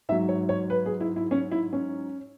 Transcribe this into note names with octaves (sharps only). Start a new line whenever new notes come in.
G#2 F#3 E5
C#5
C#5
B4
G#4
E4
E4
C#4
E4
C#4